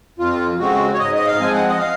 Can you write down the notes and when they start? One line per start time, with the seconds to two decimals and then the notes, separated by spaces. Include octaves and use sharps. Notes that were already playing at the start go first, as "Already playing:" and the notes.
0.19 F2 F4
0.59 C#3 G#3 C4 F#4
0.94 C#5
0.99 G#2 D#5
1.15 D#5
1.26 F5
1.40 F3 G#3 C4 G#5
1.53 F#5
1.69 D#5
1.78 F5